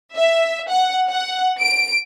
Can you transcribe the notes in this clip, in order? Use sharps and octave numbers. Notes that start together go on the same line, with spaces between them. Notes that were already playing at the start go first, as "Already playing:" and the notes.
E5
F#5
F#5
D7